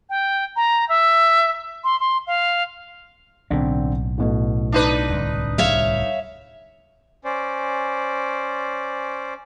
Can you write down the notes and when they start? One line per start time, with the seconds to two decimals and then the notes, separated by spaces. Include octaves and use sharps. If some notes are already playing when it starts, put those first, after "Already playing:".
0.10 G5
0.56 A#5
0.89 E5
1.84 C6
2.00 C6
2.27 F5
3.50 B1 A2 D3 C4
4.18 A1 B2 A4
4.72 D4 D#4 B4
5.09 D1 C2
5.58 G3 C#5 E5 F5
7.25 C#4 C5 D5